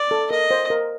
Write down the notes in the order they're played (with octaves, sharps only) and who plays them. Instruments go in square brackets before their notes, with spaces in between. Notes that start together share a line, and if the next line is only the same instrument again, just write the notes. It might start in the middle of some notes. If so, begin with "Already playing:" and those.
Already playing: [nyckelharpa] D5
[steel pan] A4
[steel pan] A#4 [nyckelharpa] D#5
[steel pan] C5
A#4